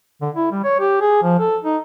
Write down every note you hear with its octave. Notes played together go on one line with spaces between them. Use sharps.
D3
E4
G3
C#5
G4
G#4
F3
A4
D#4